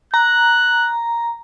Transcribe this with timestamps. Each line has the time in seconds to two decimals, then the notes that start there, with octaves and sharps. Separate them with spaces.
0.14 A#5 F#6